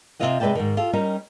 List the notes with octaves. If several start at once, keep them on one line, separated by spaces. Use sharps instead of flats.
C3 G#3 C4 F4 D#5 F#5
C3 G#3 B4 D5 G5 A5
G#2 D#3
F4 G4 A4
G3 C#4 D#4 G4 A#4